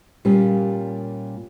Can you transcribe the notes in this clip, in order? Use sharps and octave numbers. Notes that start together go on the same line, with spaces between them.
A#2 G3 A#3 C#4